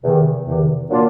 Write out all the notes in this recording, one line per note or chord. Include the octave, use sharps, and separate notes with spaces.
E2 C3 D#3
E2 C3 D#3
A#2 F#3 A#3 D4 F4